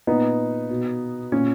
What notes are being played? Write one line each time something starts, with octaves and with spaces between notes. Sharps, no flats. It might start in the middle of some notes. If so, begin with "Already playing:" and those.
A#2 B3 D#4
B2
A#2 C#4